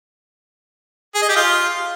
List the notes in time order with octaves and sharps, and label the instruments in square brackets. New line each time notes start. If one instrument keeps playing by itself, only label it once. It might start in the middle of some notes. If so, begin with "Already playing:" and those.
[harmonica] G#4
D#5
G4
F4